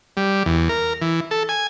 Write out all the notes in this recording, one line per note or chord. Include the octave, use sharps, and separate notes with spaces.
G3
E2
A#4
E3
A4
G#5